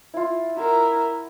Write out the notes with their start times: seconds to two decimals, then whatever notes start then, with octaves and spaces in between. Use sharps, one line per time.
0.14 E4 F4
0.57 E4 F#4 A#4 B5